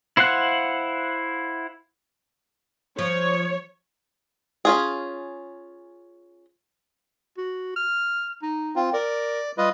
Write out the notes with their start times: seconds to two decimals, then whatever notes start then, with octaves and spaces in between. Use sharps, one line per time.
0.17 E4 C5 F5 F#5 F#6
2.99 F3 C#5
4.65 C#4 F4 G#4
7.37 F#4
7.76 F6
8.43 D#4
8.76 C4 F4
8.93 A#4 D5
9.58 G3 F4 B4 D#5